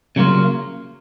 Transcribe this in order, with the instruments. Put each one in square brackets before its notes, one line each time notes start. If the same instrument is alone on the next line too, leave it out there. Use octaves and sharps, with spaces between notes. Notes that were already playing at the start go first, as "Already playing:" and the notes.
[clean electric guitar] C#3 F#3 A#3 F4